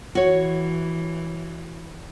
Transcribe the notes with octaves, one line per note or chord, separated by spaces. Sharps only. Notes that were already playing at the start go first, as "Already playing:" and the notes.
E3 F#4 C#5